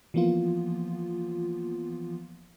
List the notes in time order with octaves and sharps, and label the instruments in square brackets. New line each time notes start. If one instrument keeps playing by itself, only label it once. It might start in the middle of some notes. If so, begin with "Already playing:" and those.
[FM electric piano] E3 F3 A#3 B3 F4